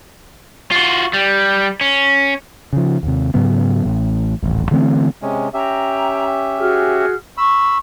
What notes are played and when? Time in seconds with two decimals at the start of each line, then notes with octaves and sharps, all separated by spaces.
0.71 F4 F#4
1.13 G3
1.81 C#4
2.73 C#3 F3
3.03 D#2 C3
3.34 G#2 C#3 F#3 B3
3.85 A1 A2
4.43 D#1 A1 F2
4.71 D3 E3 A3 C4
5.22 C3 G#3 C#4
5.54 C#4 G4 E5 G5 A#5
6.58 F#4 G#4 F6
7.38 B5 C#6 E6